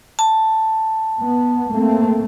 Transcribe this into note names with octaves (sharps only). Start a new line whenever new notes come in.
A5
B3
A3 A#3 C4